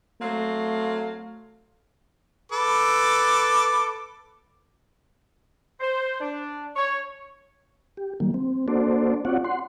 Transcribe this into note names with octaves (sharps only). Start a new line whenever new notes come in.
F#3 A3 C4 F5
A4 B4 D6
C5
D4
C#5
G4
D#3 F#3 G3 A#3
C4
A#3 D4 F#4 A4 C5 D5
C4 F4 F#4 C#5 D5 F#5
F#5 C6